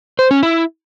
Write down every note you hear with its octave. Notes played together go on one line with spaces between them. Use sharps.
C5
C#4
E4